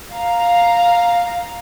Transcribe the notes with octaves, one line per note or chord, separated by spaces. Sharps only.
F5 A#5